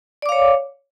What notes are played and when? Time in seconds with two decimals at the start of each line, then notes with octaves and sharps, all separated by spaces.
0.22 D5
0.26 D6
0.29 F5
0.32 C#5